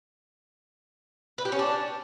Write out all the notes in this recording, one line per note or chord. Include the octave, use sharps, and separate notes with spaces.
B4
G4
C#4
D4